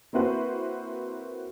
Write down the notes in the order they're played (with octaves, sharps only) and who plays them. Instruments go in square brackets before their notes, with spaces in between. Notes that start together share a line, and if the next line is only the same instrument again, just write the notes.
[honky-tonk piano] A#3 C4 E4 F#4 B4 C5